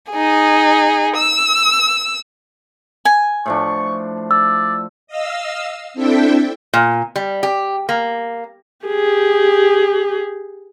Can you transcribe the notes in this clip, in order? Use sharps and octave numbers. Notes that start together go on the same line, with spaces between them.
D#4 G#4
E6
G#5
A2 F3 D4 C#6
D5 E6
D#5 F5 E6
C4 D4 E4 A4 E5 G5
A#2
G3
G4
A#3
G4 G#4